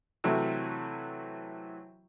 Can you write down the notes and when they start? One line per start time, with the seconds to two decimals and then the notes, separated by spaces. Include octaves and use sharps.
0.24 C3 E3 F#3 A3